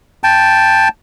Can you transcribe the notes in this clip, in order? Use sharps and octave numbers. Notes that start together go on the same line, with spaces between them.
G5 A5